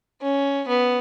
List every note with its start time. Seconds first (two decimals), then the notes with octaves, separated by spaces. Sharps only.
0.22 C#4
0.68 B3